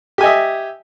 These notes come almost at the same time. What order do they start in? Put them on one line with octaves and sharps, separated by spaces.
G4 G#5 D#5 E5